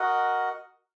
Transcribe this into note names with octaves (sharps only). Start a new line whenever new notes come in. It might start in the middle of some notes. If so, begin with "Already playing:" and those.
Already playing: F#4 A#4 D#5 F#5